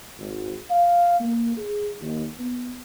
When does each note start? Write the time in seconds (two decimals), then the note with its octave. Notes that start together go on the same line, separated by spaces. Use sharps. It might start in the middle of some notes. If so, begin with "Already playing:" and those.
0.19 G#1
0.69 F5
1.19 A#3
1.56 G#4
2.01 D#2
2.38 B3